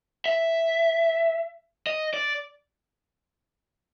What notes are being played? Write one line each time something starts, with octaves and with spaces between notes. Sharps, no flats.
E5
D#5
D5